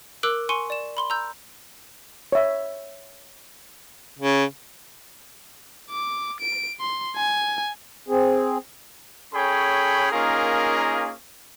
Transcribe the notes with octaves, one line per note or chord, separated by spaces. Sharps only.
A#4 D6 E6 F#6 D7 F#7
G#5 C6 C#6 C#7 D#7
D5 E7
B5 C6 G7
A#5 E6 G6
C#5 E5
C#3
D6
D7
C6
G#5
C4 G#4
C#4 G#4 A4 C#5 G5 B5
A#3 C#4 D#4 F4 G#4 A#4